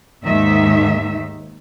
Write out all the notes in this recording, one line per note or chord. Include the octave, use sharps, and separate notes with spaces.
D#2 G#2 D#3 D#4 E5